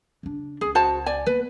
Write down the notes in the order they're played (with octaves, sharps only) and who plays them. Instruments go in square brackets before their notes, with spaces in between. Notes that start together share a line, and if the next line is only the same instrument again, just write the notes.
[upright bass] C#3 D4
[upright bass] C#2 [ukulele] G#4
[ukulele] F#4 C5 A5
D5 G#5
[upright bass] A#3 B3 [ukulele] B4